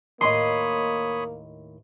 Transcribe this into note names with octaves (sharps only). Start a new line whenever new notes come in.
D#2 A2 A#3 C#5 D#5 B5 C6 D#6